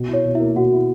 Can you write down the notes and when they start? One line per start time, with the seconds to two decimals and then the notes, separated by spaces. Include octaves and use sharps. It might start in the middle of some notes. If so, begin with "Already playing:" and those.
Already playing: B2
0.08 E4
0.13 C#5
0.25 B2
0.35 A#3 E4 E5
0.56 B2 F#4 F#5
0.73 E4